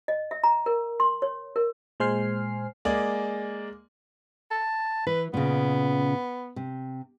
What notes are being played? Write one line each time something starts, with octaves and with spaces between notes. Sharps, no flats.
D#5
E5
A#5
A#4
C6
C#5
A#4
A#2 G#3 C5 G#5 F6 C7
G#3 A#3 G#4 D5
A5
E3 B4
A#2 C#3 B3
C3